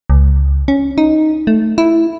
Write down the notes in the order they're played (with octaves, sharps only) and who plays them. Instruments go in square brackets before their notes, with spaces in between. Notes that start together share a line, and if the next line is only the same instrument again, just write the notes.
[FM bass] C#2
C#4
D#4
A3
E4